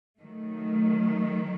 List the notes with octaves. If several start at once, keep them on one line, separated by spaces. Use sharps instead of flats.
D#3 F#3 A3